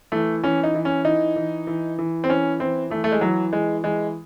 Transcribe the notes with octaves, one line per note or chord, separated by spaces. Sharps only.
E3 A3
E3 C#4
D#4
E3
C#4
E3 D#4
E3
E3
E3
C4
E3 C#4
E3 C4
E3 A3
A3
G#3
E3 F#3
E3 G#3
E3 G#3